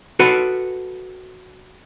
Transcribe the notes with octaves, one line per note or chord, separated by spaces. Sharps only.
F#4 A4 B4